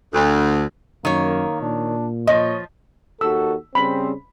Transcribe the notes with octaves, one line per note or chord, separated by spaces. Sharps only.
D2
F#2 D#3 A#3 C#5
A#2 D4
F3 C#5 D#5
D#2 F#4 A4 E6
C#3 G3 C4 B5